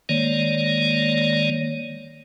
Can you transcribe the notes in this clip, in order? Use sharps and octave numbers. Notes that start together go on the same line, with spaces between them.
D#3 G#3 A#3 C#5 D5